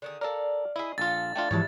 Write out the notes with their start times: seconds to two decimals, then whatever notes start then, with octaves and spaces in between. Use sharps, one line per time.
0.02 D3 D#3 G#4
0.21 A4 A#4 D5 F5
0.76 E4 G#4 D#5 E5
0.98 A#1 F4 A4 A6
1.36 A3 D4 F4 G5
1.51 G#2 E3 F3 G3 G#3 E4 C#5 A5